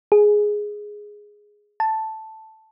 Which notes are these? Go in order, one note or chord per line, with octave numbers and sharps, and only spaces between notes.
G#4
A5